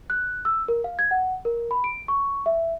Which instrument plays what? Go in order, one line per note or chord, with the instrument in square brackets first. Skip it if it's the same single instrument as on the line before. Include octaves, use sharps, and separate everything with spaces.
[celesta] F#6
E6
A#4
F5
G#6
F#5
A#4
B5
D7
C#6
E5